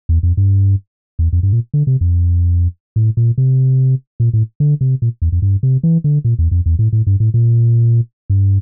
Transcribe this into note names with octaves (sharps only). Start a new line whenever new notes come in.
E2
F2
G2
E2
F2
G2
A#2
D3
C3
F2
A2
A#2
C3
A#2
A2
D3
C3
A#2
E2
F2
G2
C3
E3
D3
A#2
E2
F2
E2
A2
A2
G2
A2
A#2
G2